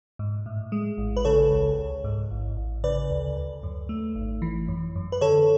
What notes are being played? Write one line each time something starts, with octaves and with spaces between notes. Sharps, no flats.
G#2
A2
G#3
A1
B4
C#3 A4 C#5
C#2
C#2
G#2
A1
A1
C#3 B4 D5
D2
D2
F#2
A3
G#1
E3
F#2
F#2
B4
D3 A4 C#5